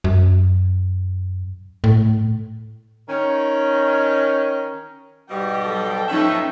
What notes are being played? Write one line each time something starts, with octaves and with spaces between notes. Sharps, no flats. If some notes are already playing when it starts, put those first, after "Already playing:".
F#2
A2
D#3 C#4
G#2 B2 G3 G4
F#3 A4 G5
F3 C#4 D#4 B4 C#5 E5